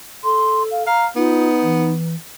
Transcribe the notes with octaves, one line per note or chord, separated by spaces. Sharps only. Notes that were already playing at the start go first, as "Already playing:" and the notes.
A4 C6
F5
F5 A#5
B3 D#4 F4
E3